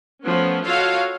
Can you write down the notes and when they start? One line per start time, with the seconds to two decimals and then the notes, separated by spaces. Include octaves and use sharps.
0.24 F3 A3 B3 C#4
0.66 F4 F#4 A4 C#5 D#5 F5